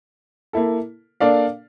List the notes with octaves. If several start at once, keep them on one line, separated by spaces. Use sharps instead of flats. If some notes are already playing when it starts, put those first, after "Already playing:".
A#3 E4 A4
A#3 D4 A4 D5 F5